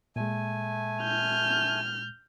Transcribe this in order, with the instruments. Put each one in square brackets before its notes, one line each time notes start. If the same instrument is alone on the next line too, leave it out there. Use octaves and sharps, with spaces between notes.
[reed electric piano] A#2 G#3 [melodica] A3 G#5
[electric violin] F6 G6